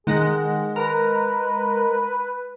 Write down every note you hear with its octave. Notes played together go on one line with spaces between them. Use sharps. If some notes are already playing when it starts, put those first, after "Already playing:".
D#3 G#3 G#4 F#5 A#6
A#4 B4 A#5